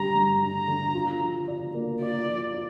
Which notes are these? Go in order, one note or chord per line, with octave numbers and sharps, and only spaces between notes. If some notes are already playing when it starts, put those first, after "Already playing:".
Already playing: G2 D3 G3 A#5
G2
D4 A#5
D3
F4
F3
D5
A#3
F4 D5
F3
D5